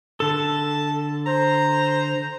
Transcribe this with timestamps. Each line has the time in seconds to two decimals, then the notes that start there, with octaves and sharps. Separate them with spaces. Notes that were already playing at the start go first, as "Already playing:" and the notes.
0.20 D3 A4 A5
1.26 C5 A#5